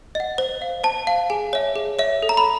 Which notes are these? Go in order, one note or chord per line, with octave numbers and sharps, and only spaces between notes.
D#5 F#5
C5
F5
C5 A5
F5
G#4 G#5
C#5 E5
G#4
C#5 E5
A4
A#5
B5